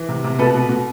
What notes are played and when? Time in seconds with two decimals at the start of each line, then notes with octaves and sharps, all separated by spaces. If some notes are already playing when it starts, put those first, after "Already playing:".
Already playing: E3
0.09 C3
0.24 C3
0.39 B2 A4 B4
0.54 B2
0.69 B2